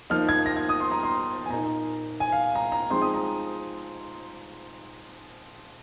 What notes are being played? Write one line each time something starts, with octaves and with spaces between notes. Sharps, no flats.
F3 A#3 D#4 F6
G#6
A#6
G#6
D#6
C6
A#5
C6
G#5
A#2 A#3 D#4 A#5
G#5
F5
A#5
A#5
F3 G#3 C4 D#4 C6
D#6
A#5